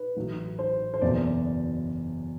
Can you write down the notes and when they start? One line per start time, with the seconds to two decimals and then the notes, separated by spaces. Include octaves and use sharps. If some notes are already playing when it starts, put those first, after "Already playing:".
Already playing: B4
0.17 A1 A2 F#3
0.59 C5
0.94 C5
1.01 F#1 E2 B2 A3 D5